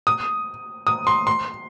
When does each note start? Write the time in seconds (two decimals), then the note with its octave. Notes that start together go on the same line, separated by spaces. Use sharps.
0.07 D#6
0.87 D#6
1.07 C6
1.27 C6